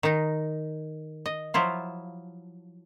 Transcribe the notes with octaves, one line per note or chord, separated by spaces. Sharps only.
D#3 D#4
D#5
F3 F#3 E4 F4